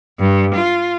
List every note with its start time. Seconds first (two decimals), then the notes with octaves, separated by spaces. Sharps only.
0.20 G2
0.55 F4